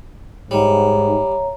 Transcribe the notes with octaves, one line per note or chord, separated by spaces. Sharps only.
G#2 G3 C#5 E5 A#5